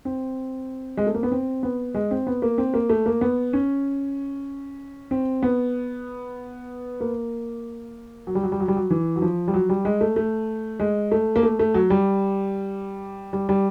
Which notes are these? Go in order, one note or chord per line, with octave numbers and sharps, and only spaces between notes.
C4
G#3
A3
A#3
B3
C4
B3
G#3
C4
B3
A#3
C4
A#3
A3
A#3
B3
C#4
C4
B3
A#3
F#3
G3
F#3
G3
F#3
G3
F#3
E3
F#3
F3
G3
F#3
G3
G#3
A3
A3
G#3
A3
A#3
A3
A3
F#3
G3
G3
G3